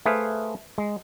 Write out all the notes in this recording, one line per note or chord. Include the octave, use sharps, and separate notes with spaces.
A3 G#4 B4 C5 E5 F5
G#3